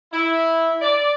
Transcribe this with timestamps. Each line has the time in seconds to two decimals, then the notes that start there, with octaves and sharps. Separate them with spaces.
0.13 E4
0.81 D5